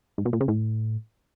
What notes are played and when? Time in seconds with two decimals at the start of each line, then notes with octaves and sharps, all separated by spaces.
0.18 G#2
0.25 B2
0.33 A#2
0.41 C#3
0.48 A2